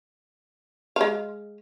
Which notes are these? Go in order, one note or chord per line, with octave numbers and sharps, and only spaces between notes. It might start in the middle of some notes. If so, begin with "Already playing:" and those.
G#3 F5